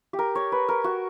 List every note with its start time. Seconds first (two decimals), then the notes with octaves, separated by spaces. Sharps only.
0.13 G4
0.19 A#4
0.35 C#5
0.52 B4
0.69 A#4
0.84 F#4